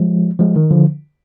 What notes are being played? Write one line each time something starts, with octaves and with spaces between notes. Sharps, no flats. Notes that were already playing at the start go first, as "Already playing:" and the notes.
Already playing: F3 G#3
F3 G#3
D#3
D3 F3